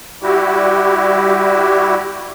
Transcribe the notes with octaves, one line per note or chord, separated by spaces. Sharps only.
G3 E4 F#4 G4